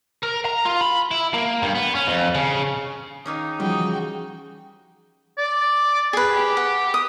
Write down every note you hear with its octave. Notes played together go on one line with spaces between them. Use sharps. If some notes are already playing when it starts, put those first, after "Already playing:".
A#4
A#5
F4
B5
E4
A#3
G2
B3
C#4
F2
C#3
D#3 A#3 C#4 D#4
C#3 E3 F3 G3 D#4 F#4 G5
D5
G#4 B4
G4
F#5
D#6